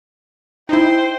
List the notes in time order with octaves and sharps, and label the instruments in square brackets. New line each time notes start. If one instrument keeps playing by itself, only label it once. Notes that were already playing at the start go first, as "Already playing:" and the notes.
[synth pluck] D#4 E4 [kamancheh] C5 G5